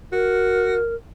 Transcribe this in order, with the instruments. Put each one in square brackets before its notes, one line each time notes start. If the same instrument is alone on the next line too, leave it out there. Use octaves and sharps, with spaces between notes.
[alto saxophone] F#4 [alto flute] A#4